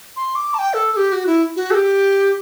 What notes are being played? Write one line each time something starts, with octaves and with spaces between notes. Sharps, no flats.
C6
D6
A5
G5
A4
A4
G4
F#4
E4
F#4
A4
G4